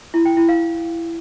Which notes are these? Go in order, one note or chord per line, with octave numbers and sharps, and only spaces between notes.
E4
G5
E4
F5